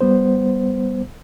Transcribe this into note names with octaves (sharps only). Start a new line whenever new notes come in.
G3 B3 C5